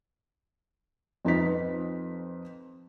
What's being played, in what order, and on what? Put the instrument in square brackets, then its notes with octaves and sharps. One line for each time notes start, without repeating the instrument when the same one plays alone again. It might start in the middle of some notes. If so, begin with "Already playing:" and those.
[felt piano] F2 D#4 B4 B6